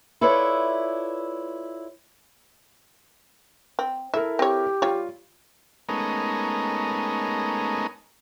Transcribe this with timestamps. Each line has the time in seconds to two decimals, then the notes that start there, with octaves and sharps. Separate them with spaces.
0.21 E4 F4 A4 B4 C#5 D5
3.79 C4
4.14 E4 A4 A#4 E5
4.39 C4 G4 C#5
4.82 G3 F4 C#5
5.89 G#3 A3 B3 C#4 D#4 A#4